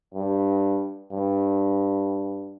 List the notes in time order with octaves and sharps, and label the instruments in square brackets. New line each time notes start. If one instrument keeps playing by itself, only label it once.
[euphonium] G2
G2